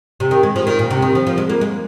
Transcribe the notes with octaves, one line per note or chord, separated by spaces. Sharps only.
C3
D#3
G#3
F3
D#3
A#2
C3
D#3
F3
F3
G#3
A#3
G#3